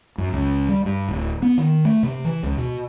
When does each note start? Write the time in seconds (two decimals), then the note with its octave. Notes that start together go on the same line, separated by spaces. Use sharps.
0.18 F#2
0.33 C#2
0.69 G3
0.85 G2
1.09 D1
1.42 B3
1.58 D#3
1.85 A3
2.03 C3
2.24 E3
2.43 C#2
2.57 B2